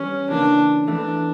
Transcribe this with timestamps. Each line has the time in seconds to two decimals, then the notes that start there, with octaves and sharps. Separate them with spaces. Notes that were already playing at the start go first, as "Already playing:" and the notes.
Already playing: E2 G3 C#4
0.29 C#3 E3 A#3 D4
0.87 E2 E3 A3 D4